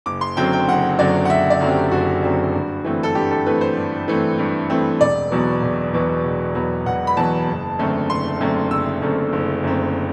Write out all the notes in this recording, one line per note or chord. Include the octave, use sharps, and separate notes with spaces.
F#1 D6
C6
F#2 D3 F#3 C4 G5
G5
F#1 F#5
F#2 D3 F#3 C4 D5
F#5
F#1 E5
D5
F#2 D3 F#3 C4
G4
F#1 F#4
F#2 D3 F#3 C4
G2
E3 A3 C4
A4
G2 G4
A4
E3 A3 C4 B4
C5
G2
E3 A3 C4
G2
E3 A3 C4
E1 D5
E2 B2 F#3 B3
E1
E2 B2 F#3 B3
E1
E2 B2 F#3 B3
E1 F#5
B5
E2 B2 F#3 B3 A5
F#1
F#2 D3 A3 C4
F#1 C6
F#2 D3 A3 C4
F#1 E6
F#2 D3 A3 C4
F#1
F#2 D3 A3 C4